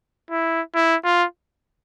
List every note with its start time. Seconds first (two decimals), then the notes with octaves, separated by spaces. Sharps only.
0.31 E4
0.75 E4
1.05 F4